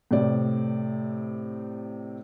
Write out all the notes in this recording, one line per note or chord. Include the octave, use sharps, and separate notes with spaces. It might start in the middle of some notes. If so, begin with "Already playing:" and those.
A2 C3 D5